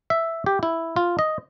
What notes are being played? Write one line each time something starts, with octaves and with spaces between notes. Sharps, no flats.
E5
G4
E4
F4
D#5